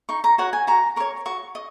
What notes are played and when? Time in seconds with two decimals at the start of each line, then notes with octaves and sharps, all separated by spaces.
0.09 D#4 C#6
0.24 A#5
0.38 F#4 C#5 F#5
0.53 G#5
0.67 F#4 A#5
0.96 A#4 C#5 C#6
1.26 F#4 C#6
1.55 D#5